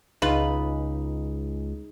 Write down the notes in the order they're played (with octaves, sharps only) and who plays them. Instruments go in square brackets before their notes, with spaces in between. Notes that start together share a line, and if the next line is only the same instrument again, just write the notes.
[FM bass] C#2 [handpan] D#4 G#4 [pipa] F4 B4